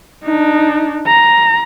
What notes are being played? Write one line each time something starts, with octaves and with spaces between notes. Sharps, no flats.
D4 D#4
A#5